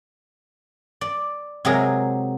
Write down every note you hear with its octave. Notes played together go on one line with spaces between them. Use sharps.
D5
C3 F#3 G#3 G#4 A#4